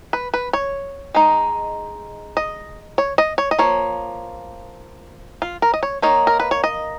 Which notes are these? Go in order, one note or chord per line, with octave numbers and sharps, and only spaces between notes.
B4
B4
C#5
G#3 D#4
D#5
C#5
D#5
C#5
D#5
F3 A#3 C#5
F4
A#4
D#5
C#5
D#3 A#3 D#4 C#5
A#4
B4
C#5
D#5